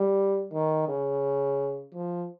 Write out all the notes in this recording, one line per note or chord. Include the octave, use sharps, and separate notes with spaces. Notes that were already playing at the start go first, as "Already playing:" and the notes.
Already playing: G3
D#3
C#3
F3